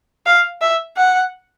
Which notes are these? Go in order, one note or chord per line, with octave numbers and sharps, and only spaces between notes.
F5
E5
F#5